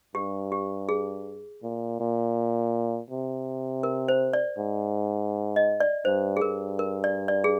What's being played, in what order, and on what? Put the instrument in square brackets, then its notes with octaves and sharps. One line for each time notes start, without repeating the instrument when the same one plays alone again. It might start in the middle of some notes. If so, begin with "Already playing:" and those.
[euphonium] G2 [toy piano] G4
[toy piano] G4
G#4
[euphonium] A#2
A#2
C3
[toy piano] A#4
C5
D5
[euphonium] G#2
[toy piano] D#5
D5
[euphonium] G2 [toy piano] C5
[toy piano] G#4
[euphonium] G2 [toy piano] A#4
[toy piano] A#4
D5
D5
G#4